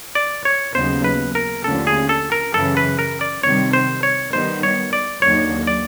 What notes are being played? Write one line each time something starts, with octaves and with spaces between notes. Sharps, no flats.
D5
C#5
D#2 C#3 F#3 B3 D#4 C5
B4
A#4
D#2 D3 F3 A3 C#4 A4
G#4
A4
A#4
F#2 C#3 E3 A4
B4
A#4
D5
C3 D#3 G3 C4 C#5
C5
C#5
D#3 G3 B3 D#4 C5
C#5
D5
D#2 D3 F#3 A#3 D#4 C#5
D5